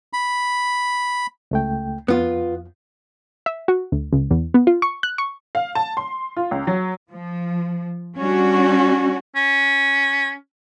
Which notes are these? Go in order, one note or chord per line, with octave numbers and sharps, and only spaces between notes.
B5
C#2 A3 G5
F2 B3 F4
E5
F#4
D2
C#2
E2
B3
F4
C#6
F#6
C#6
F5
A5
C6
F4
C#2
F#3
F3
G3 C#4 D4 F#4
C#4